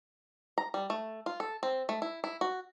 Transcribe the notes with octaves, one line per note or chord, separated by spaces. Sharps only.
A#5
G3
A3
F4
A4
C4
A3
E4
E4
F#4